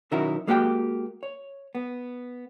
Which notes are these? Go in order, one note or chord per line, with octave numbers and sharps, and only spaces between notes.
B1 D#3 C#4 E4 F#4 A#4
G#3 A#3 F#4 G4 E5 G5
C#5
B3